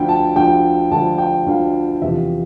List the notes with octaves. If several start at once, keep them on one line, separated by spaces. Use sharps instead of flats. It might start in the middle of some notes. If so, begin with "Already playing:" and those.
Already playing: D2 D3 F3 G5
A5
D2 D3 F3 G5
D2 D3 F3 A5
G5
D2 D3 F3 F5
E2 C3 F3 E5